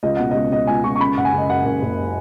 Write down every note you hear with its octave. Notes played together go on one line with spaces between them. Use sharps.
C#2 D#5
B2 F#5
C#2 D#5
B2 D#5
C#2 G#5
C#2 C#6
C#6
C#3 B5
F#1 F#5
G#5
C#3
D#5
F#2 F#5
F#1
F#1